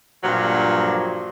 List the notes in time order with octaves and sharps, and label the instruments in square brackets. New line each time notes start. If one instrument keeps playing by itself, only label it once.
[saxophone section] G2 A#2 F3 F#3 D4